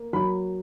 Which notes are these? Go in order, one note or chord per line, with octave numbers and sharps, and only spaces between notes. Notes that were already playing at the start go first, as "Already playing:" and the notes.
Already playing: A#3
F#3 B5